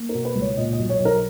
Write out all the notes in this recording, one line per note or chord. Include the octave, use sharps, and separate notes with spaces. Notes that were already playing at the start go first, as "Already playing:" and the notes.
Already playing: A#3
A#4
B2
B4
C#2
C#5
A#2 D#5
D#5
B1
C#5
B1
A#4